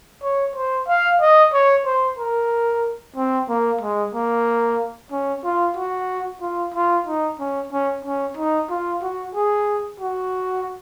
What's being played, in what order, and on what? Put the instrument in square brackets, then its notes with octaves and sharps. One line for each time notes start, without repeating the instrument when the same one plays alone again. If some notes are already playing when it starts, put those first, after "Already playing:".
[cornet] C#5
C5
F5
D#5
C#5
C5
A#4
C4
A#3
G#3
A#3
C#4
F4
F#4
F4
F4
D#4
C#4
C#4
C#4
D#4
F4
F#4
G#4
F#4